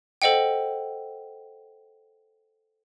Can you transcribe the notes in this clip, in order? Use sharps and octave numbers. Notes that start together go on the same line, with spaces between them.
A4 C5 D#5 F#5 G5